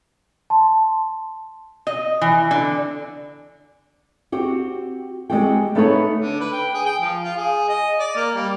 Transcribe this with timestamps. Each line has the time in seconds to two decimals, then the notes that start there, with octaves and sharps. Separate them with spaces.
0.50 A5 C6
1.87 D#5
2.21 E3
2.51 D3
4.32 C4 F#4 G4
5.30 G#3 B3 C4 F#4 G4 G5
5.75 A3 B3 D#4 A4 B4 C#5
6.17 D3
6.40 B4
6.52 G5
6.74 G#4
6.86 G5
7.01 F3
7.24 F4
7.37 G#4
7.68 D#5
7.99 D5
8.16 A#3
8.35 G3